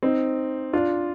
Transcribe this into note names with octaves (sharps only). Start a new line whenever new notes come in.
C4 D#4
D4 F4